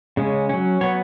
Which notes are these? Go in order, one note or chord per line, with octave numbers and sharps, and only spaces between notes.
C#3 G#3 C#4
F#3 C#4
F#3 B3 C#5